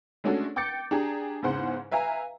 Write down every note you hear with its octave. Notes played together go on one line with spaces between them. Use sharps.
G#3 A3 C#4 D4 F#4 A4
G5 D6 G6 A6 C#7
D4 G4 G#4 A#5
E2 G#2 C#3 C5 F#5 C6
B4 E5 F5 G#5 A#5